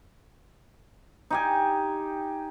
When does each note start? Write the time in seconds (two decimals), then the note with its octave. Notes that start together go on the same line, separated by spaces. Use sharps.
1.30 D#4 G4 G#5